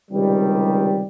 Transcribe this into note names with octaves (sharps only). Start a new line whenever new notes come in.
C#2 C3 D#3 G3